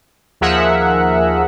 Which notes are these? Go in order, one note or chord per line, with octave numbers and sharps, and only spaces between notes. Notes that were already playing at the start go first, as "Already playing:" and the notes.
D#2 F3 G#4 A#4 E5 F#5